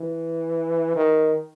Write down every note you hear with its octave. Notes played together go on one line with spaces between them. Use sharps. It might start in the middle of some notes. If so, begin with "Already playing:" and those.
Already playing: E3
D#3